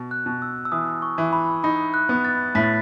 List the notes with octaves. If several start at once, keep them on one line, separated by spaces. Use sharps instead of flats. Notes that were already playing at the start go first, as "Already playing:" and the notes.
Already playing: B2
F#6
B2
E6
E6
E3 D#6
C#6
E3
B5
D#4 B5
F#6
B3
F#6 A6
A2 B6
A6